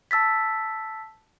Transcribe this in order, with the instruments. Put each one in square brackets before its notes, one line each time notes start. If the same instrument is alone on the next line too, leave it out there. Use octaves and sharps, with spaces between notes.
[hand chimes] A5 E6 A6 B6